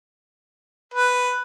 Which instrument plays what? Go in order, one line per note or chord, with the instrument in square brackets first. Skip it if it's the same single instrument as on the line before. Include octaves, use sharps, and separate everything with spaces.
[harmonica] B4